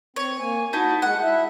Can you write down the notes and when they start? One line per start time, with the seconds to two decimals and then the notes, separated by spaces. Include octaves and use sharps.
0.16 C4 C#5
0.39 A#3 G#5
0.73 D#4 E4 F#4 A5
1.02 G#3 F#5
1.22 E4 E5